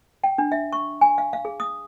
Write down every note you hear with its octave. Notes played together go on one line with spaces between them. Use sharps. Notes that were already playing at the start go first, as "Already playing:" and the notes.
G5
D4
E5
C#6
G#5
F5
F5
G#4
D#6